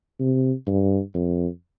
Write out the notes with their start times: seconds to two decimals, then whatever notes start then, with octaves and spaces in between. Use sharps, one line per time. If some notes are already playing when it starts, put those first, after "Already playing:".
0.20 C3
0.67 G2
1.14 F2